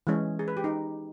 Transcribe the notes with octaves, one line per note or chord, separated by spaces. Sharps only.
E3 G#3 C#4
G#4
B4
G4
D#4